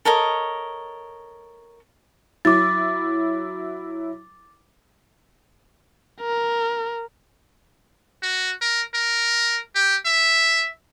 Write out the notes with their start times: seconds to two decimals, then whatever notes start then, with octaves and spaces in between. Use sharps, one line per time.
0.05 A4 A#4 C#5 D#5
2.45 F#3 E4 D6 A6
6.21 A#4
8.23 F#4
8.61 A#4
8.94 A#4
9.75 G4
10.05 E5